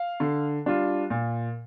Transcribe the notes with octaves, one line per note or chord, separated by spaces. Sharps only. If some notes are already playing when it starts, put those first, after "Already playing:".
Already playing: F5
D3
G3 D4 F4
A#2